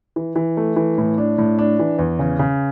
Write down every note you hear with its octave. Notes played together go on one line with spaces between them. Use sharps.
E3
E3
A3
E3
A2
D4
A2
D4
E3
E2
C#3
C#3